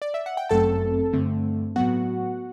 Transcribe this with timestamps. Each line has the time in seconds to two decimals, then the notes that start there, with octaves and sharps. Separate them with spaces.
0.02 D5
0.14 E5
0.26 F#5
0.37 G5
0.49 G1 F#2 F#3 A3 C4 A4 A5
1.13 G2 D3 A3 C4
1.76 A2 F#3 B3 F#4 F#5